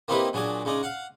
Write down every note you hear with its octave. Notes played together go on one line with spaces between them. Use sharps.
A#3 C4 D#4 E4 G4 B4
A#2 F#3 D4 G#4 D6
C#3 G#3 D#4 D5
F5 F#5